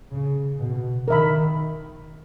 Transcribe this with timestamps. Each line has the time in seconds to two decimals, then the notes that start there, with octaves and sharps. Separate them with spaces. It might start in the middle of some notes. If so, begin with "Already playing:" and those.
0.12 C#3
0.60 B2
1.08 D#3 A#4 E5 B5